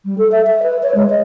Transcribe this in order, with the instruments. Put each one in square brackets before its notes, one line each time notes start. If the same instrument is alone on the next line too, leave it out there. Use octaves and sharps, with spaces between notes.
[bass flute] G3
A4
E5
E5
B4
C#5
G#3
D#5